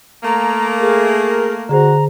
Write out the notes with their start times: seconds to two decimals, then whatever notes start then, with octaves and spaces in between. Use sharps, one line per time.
0.24 A3 A#3 A#5
0.80 G#4 A#4
1.69 D3 F#4 G#4 C5 A#5